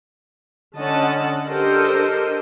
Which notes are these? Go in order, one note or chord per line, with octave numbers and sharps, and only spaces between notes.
D3 C#4 D#5 F#5 A5
D4 G4 A4 A#4 C5 D#5